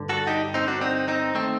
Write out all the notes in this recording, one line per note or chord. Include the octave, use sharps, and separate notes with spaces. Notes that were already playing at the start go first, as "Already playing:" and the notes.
Already playing: G2 D3
F#4 A4
D#4 G4
C4 D#4
D4 F#4
C4 D#4
C4 D#4
D#3 A3 C4